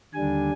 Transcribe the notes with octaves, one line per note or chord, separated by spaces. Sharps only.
D#2 D3 G3 D4 G#5